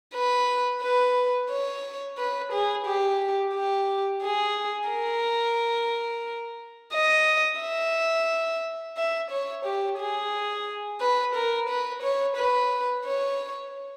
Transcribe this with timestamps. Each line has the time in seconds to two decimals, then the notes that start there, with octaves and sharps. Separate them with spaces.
0.14 B4
0.82 B4
1.50 C#5
2.18 B4
2.52 G#4
2.86 G4
3.54 G4
4.22 G#4
4.89 A#4
6.93 D#5
7.61 E5
8.97 E5
9.31 C#5
9.65 G4
9.99 G#4
11.01 B4
11.35 A#4
11.69 B4
12.02 C#5
12.37 B4
13.05 C#5